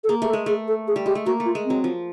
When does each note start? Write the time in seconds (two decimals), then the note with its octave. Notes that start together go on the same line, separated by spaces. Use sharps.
0.04 A4
0.09 A#3 G#4
0.22 A3 G#4
0.28 A4
0.33 G#3
0.46 A3 G#4
0.68 A4
0.87 G#4
0.96 G3
1.06 G#3 G4
1.15 A3
1.26 A#3 F#4
1.40 A3
1.45 F4
1.55 G#3
1.65 F#3 C4
1.84 F3